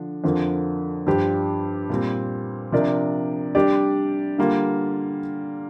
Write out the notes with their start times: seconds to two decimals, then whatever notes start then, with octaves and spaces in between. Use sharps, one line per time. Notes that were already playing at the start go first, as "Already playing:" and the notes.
Already playing: D3 F3 D4
0.24 F2 D3 F3 D4 A#4
1.06 G2 F3 D4 G4 C5
1.89 A#2 G3 C4
2.72 C3 F3 D4 A#4 D5
3.55 G3 D4 G4 D5
4.38 D3 G3 A#3 F4